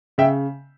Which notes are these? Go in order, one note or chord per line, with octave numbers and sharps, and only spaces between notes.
C#3 E5 G5